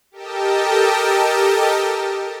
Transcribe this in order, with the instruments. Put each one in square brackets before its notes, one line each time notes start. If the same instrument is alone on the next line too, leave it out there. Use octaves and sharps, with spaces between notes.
[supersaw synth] G4 A4 A#4 D#5 G5 A5